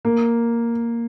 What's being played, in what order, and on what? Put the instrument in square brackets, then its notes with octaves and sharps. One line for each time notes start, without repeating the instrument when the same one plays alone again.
[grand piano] A#3